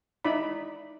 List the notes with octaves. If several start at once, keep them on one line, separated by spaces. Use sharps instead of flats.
D#4 E4 D5 B5